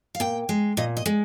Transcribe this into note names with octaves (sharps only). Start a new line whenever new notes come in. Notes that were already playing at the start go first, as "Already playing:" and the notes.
F5
A#2 G5
G#3
A#2 D#5
D#5
G#3